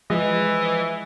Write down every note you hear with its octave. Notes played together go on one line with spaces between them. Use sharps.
E3 F3 G#3 D#5